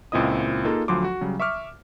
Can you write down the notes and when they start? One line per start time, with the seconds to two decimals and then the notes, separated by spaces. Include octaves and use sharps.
0.12 C#2 A#2 C4 E4 D#5 D#6
0.65 A#3 D#4 F4 G#4 A4
0.88 D2 F3 F#3 C6 D6
1.04 F#4
1.21 C#3 F#3 G3
1.40 E5 C#6 D6 F6